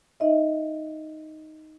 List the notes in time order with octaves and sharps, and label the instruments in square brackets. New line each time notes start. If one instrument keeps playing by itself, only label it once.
[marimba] D#4 D#5 E5